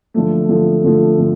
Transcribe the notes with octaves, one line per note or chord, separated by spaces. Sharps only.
D3 F3 A3
D3 F3 A3
D3 F3 A3
D3